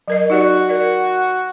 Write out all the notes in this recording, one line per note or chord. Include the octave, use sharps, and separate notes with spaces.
F#3 A#4 D#5
D#4 F#4 G4 D5
A#4 D5